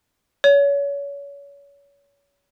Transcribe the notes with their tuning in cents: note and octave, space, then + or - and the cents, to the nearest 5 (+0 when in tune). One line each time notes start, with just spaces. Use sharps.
C#5 +30